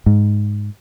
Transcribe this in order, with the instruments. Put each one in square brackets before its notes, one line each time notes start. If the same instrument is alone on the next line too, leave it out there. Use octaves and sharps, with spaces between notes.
[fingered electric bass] G#2